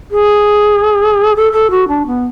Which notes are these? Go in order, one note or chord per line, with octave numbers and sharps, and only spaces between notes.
G#4
A4
A4
F#4
D4
B3